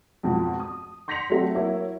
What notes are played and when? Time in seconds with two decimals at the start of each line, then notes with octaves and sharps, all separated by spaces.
0.23 F2 G#2 B2 F3
0.60 D#6
1.08 C6 G6 A#6 B6 C#7 F7
1.30 F#3 A3 C4
1.55 F#3 A#3 E4 C#5